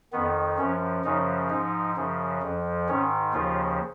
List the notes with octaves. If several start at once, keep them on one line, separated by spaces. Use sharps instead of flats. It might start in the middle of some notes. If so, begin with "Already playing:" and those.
F2 D#3 B3
F#2 F3 C#4
F#2 C#3 F3 D#4
G#2 F3 D#4
F#2 C#3 F3
F2 F3
G#2 D#3 C#4
D#2 C#3 F3 F4